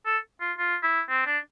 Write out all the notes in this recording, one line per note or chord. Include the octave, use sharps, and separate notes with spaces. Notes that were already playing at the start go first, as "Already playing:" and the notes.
A4
F4
F4
E4
C4
D4